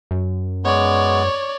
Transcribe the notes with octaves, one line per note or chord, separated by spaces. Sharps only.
F#2
G#3 B3 C#5 D5